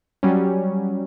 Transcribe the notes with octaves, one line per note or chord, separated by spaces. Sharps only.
F#3 G3 C#4